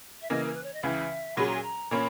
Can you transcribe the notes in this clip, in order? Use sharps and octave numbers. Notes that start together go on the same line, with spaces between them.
E5
C#3 E3 A#3 D#5
A#4
B4
C#5
D#5
C#2 C#3 E3 E5
A#2 F#3 C#4 G#4 B5
A#5
G#5
A#5
A#2 A#3 C#4 B5